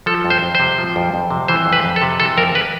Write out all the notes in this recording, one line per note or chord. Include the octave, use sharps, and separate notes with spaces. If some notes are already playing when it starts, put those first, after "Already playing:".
F3 A4
F2
C5
F2
C5
C3
F3
F2
F2
C3
E3 C5
F2
B4
F2
A4
C3
E3 A4
F2 A#4
B4